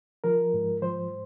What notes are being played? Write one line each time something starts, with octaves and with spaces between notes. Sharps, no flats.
F3 A#4
G#2
F3 C5